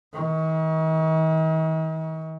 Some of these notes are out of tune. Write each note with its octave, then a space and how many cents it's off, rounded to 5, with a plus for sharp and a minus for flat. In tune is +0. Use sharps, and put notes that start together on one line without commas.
D#3 +45